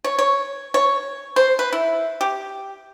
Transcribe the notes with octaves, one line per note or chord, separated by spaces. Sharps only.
C#5
C#5
C#5
C5
B4
E4
G4